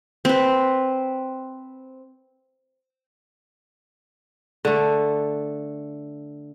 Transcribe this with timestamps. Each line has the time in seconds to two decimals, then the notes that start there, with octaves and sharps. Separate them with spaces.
0.25 C4 B4
4.65 D3 A3